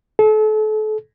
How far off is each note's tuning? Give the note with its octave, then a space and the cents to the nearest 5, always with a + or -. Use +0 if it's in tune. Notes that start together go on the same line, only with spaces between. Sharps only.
A4 -35